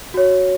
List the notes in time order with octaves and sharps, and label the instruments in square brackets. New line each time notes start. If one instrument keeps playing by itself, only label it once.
[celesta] F#4 C#5